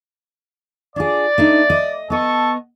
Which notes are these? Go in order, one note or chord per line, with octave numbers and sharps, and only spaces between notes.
D4 F4 G#4 D5
A3 D4 D#4
D#5
B3 A4 D#5 A5 C#6